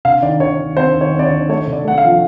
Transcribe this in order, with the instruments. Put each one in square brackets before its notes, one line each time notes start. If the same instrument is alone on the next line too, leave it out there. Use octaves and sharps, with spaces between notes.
[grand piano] C3 F5
D#3 D5
D#3 C#5
D#3
C4 C5
D#3
C#5
C4
D5
C#5
D#3
A3 C#5
C3
D5
A3 F#5
F5
F3